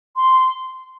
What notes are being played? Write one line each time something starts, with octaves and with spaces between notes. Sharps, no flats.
C6